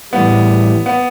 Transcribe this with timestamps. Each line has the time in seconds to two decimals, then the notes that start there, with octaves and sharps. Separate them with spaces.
0.13 A2 E3 G3 B3
0.86 B3